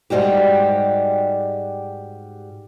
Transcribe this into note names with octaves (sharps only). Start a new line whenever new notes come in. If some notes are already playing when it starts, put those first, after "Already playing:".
G#2 G3 F#4 G4